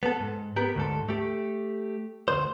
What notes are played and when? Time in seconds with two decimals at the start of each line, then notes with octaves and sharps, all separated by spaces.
0.03 B3 A4
0.20 G#2
0.56 B3 G4 A#4
0.75 D2 G#2 A4
1.09 A3 G4
2.28 D2 C3 C5